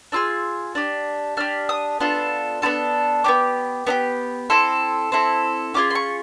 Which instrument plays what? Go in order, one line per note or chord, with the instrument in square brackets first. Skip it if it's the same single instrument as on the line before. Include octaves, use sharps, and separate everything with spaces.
[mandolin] D4 F4 G#4 E6
D4 G4
D4 G4 F6
D#6
B3 D4 F4 A4
B3 D4 F4 A4
B3 D4 G4 D6
B3 D4 G4
C4 E4 A4 C6
C4 E4 A4
C#4 F4 G#4 D6
C6
C#6